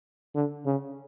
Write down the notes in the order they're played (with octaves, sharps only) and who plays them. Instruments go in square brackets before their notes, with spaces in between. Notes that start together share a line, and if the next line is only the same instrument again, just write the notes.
[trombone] D3
C#3